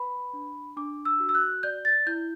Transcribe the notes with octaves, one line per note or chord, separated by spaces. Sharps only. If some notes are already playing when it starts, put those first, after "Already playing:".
Already playing: B4 B5
D4
D4 D6
E6
F#4
E6
F#6
D5 G6
A6
E4 G6